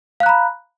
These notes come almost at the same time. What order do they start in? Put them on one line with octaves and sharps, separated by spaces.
F5 F#6 A#5 B5